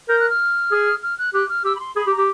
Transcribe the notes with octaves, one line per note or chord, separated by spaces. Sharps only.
A#4 G6
F#6
F6
G#4
F6
F#6
G4 F#6
F6
G4 E6
B5
C6
G#4 B5
G4
A#5
G4